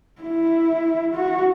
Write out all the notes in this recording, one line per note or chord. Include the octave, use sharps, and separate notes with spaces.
E4
F#4